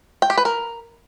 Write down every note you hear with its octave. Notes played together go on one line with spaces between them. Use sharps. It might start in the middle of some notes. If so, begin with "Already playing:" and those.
G5
G4
B4
A#4